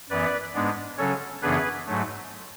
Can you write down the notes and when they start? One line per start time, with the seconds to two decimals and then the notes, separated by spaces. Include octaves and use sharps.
0.10 F#2 E3 B3 B4 D5
0.54 G#2 G#3 B3 D4
0.98 C#3 F#3 C#4 A4 C#5
1.42 F#2 C#3 E3 B3 D4 G#4 B4
1.86 G#2 F#3 A3